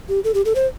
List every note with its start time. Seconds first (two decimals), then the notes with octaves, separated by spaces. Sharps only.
0.09 G4
0.24 A4
0.34 G4
0.45 A4
0.55 C5